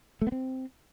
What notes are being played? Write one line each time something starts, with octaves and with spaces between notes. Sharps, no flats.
A3
B3
C4